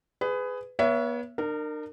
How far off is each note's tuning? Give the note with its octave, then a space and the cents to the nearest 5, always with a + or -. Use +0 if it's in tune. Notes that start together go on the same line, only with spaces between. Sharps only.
G#4 +0 B4 +25
B3 -35 C#5 +20 E5 +25
D4 +45 A#4 -20